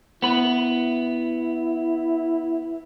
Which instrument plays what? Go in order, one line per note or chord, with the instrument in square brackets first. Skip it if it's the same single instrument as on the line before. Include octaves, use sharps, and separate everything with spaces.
[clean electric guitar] B3 B4 [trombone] E4